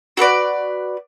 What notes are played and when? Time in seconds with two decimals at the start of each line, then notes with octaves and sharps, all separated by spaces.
0.17 F#4 A4 B4 D5